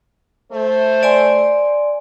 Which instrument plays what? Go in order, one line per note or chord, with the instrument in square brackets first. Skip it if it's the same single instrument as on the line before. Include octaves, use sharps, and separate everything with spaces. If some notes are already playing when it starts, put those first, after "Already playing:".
[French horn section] A3 C5
[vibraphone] D5 G#5 C6